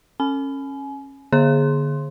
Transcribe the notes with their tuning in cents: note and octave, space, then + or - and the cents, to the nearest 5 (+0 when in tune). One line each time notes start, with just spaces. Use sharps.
C#4 -20 G#5 +30
D3 +0 G#4 +0 C6 +0